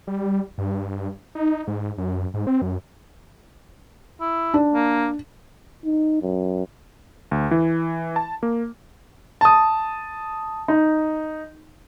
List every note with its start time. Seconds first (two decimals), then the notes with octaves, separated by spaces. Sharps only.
0.07 G3
0.58 G2
1.35 D#4
1.67 G#2
1.98 F#2
2.34 G#2
2.47 C4
2.62 F#2
4.21 E4
4.54 D4
4.74 A#3
5.85 D#4
6.22 F#2
7.31 D2
7.51 E3
8.16 A5
8.43 A#3
9.41 A5 D#6
10.68 D#4